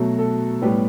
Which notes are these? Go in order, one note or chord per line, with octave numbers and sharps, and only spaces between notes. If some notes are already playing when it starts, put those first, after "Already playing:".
Already playing: B2 F#3 A3
A4
A2 G3 B3 G4